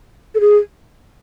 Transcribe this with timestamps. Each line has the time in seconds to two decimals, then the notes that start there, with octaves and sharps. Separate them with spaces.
0.35 A4
0.40 G#4